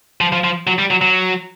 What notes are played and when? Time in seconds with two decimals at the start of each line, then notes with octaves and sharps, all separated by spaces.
0.21 F3
0.32 F3
0.44 F3
0.67 F#3
0.78 G3
0.91 F#3
1.01 F#3